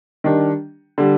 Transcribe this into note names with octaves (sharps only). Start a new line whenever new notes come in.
D#3 G3 D4
D3 G3